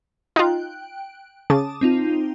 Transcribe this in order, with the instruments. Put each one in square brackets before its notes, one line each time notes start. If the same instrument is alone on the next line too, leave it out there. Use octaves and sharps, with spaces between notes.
[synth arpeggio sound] D#4 F4 [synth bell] G5 F#6
[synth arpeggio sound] C#3 [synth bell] A5 D6 D#6
[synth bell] C4 D#4 F4